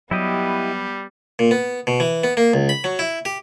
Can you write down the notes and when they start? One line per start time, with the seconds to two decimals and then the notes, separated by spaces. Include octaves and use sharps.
0.11 F#3 G3 B3 E4 G4 D#5
1.39 A#2
1.51 B3
1.87 B2
2.00 E3
2.24 B3
2.37 A#3
2.54 C#2
2.69 B5
2.84 F#3
2.99 E4
3.25 G4